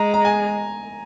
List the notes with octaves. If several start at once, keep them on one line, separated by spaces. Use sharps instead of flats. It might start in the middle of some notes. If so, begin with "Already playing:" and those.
Already playing: G#3 A#5
A#5
G#5